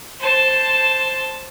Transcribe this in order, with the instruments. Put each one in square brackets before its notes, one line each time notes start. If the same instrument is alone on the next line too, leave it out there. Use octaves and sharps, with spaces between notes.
[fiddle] C5 A5